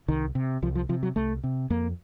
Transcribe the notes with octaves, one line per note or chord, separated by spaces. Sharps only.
C2 D#3
C3
C2 F3
F3
C3 F3
F#3
C2 A3
C3
F2 A#3